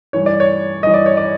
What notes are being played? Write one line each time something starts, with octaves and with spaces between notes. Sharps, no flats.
G2 E3 C#5
D5
C#5
G2 E3 D#5
D5
C#5
D5